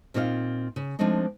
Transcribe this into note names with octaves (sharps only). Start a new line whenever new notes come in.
A#2 C4 D#4 F4 C#5 F5
C#3
F3 G#3 A3 C4 D4 D#4